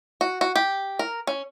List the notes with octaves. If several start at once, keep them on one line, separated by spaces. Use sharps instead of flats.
F#4
F#4
G4
A#4
C#4